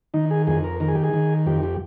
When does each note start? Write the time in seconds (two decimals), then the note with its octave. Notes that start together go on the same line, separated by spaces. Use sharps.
0.14 D#3 D#4
0.31 G#4
0.47 F2 G#4
0.64 A#4
0.80 D#3 A#4
0.88 G#4
0.95 G4
1.03 G#4
1.13 D#3
1.46 F2 G4
1.63 G4